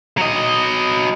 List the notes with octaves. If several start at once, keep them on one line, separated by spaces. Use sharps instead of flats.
F#3 D#5